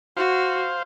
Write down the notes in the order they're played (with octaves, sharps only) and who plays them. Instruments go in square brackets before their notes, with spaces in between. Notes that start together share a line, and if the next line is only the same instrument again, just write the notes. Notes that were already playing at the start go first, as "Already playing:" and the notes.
[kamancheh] F#4 [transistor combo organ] C5 F5